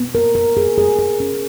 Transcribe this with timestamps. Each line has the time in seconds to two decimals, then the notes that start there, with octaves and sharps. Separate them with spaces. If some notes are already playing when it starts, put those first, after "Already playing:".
Already playing: B3
0.15 A#4
0.35 A#4
0.57 G#4
0.78 G#4
0.99 G#4
1.20 C#4